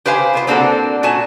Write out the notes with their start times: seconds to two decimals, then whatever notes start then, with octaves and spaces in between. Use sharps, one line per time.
0.06 G4 B4 C5 F5 G#5
0.34 C3 F4 C5
0.47 A#3 C4 D4 F#4 G#4 A4
1.03 A#2 F#4 D5 G#5 A5